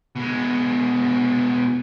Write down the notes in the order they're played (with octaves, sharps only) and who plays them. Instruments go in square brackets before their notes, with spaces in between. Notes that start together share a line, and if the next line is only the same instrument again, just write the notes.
[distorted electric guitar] B2 G#3